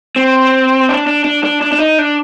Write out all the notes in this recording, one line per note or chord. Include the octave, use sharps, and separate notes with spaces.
C4
D4
D4
D4
D4
D4
D4
D#4
D4